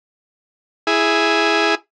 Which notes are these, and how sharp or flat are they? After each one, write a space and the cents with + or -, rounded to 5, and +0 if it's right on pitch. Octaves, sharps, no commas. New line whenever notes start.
E4 +0 G#4 +0